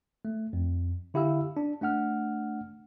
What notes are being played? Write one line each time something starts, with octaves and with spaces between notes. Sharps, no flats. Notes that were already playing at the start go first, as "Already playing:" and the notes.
A3
F2
D3 E4 G4 F5 E6
D4
A3 D4 F#5 F6